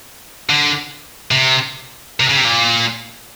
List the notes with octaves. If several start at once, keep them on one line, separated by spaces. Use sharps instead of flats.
D3
C3
C3
C#3
C3
A#2